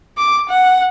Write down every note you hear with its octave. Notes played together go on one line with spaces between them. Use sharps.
D6
F#5